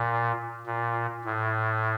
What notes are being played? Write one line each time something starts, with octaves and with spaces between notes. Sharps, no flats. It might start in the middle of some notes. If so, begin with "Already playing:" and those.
Already playing: A#2
A#2
A2